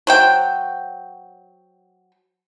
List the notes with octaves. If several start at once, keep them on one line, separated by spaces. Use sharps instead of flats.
F#3 C5 G5